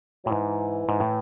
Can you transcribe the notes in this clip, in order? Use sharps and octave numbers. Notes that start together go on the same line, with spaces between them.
A2 F#3
G#2 E3
G#2
A2